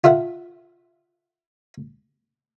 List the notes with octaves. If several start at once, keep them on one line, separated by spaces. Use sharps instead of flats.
F4 A4 E5 F#5